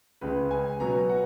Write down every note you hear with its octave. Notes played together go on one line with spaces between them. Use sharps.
C#2 C#3 G#3 B4
G#5
B2 F#3 B3 A#5
F#5